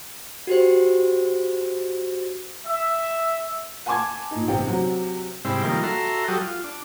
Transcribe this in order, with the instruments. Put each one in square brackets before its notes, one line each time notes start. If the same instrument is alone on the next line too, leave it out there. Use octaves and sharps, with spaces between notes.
[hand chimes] F#4 G4 C5
[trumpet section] E5
[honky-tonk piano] F#5 G#5 A5 C6 D6 G#6
A#2 D#4
A1 C3 G5
C3 F#3
[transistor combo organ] G#2 C3 G3 C4 E4
D#3 F3 G3 A#3
F#4 A4 E5 A#5 C6
F#3 G3 F#4 G4 A4 D#6
F4
D4